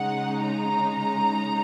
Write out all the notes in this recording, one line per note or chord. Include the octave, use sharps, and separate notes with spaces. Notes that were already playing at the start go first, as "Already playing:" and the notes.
Already playing: C#3 G#3 D#4 F#5
A#5